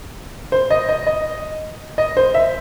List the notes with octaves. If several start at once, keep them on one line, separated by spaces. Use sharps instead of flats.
C5
D#5
D#5
D#5
D#5
C5
E5